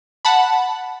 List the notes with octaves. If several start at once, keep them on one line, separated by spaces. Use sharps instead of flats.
F#5 A5 B5